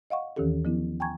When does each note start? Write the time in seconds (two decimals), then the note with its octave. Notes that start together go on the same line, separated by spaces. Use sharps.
0.10 D#5 F5 F#5 C#6
0.36 D#2 D#3 E3 C#4 G4 A4
0.65 F3 B3 E4
1.00 G5 G#5 A#5 C#6 G#6